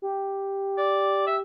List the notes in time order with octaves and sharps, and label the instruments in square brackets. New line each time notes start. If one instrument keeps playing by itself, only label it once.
[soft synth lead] G4
[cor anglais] D5
E5